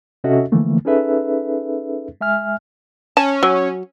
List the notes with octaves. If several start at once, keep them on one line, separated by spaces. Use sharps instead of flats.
C3 C#4 F#4 A4 D#5 E5
D3 E3 F3 A3 A#3
C#4 D#4 G#4 A4 B4 E5
G#3 E5 G#5 F6
C#4 A5
F#3